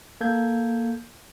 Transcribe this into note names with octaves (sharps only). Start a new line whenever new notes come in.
A#3 A4 G6 G#6